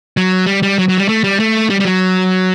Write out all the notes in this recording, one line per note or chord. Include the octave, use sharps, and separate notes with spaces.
F#3
G3
G3
F#3
F#3
G3
A3
G3
A3
G3
G3
F#3